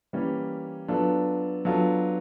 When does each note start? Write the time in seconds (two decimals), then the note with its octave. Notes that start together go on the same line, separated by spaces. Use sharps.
0.13 E3 G3 A#3 C#4
0.88 F#3 B3 D4 F4 A4
1.65 F#3 B3 D4 F4 A4